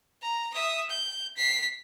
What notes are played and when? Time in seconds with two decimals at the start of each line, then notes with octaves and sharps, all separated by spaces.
0.22 A#5
0.54 E5 D#6
0.90 G6
1.37 B6 C7